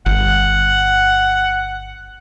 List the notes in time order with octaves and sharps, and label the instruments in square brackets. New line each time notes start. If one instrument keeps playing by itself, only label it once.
[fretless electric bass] G1 [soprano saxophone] F#5